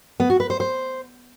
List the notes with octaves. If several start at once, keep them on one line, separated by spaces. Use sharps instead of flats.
B3
F#4
B4
C5
C5